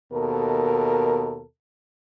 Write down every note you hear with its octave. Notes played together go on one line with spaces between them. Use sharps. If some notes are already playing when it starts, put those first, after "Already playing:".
D#2 B2 A4 A#4